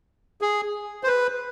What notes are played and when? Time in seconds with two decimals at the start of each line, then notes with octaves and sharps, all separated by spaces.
0.41 G#4
1.04 C5
1.07 B4